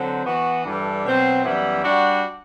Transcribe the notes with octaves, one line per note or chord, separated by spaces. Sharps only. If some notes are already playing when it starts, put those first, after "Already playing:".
Already playing: D3 F#3 C4
E3 B3 F#4
G2 E3 G3 D4 A4
B2 F#3 C4
F#2 E3 G3 B3 E4
G3 D4 F#4